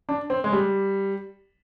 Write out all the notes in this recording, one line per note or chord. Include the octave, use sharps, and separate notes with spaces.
D4
C4
G#3
G3